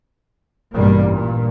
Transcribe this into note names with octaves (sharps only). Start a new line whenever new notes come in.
A1 G2 B2 G3 A#3
G2 A#2